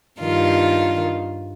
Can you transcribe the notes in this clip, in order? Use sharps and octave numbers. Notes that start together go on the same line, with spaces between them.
G2 D#3 F4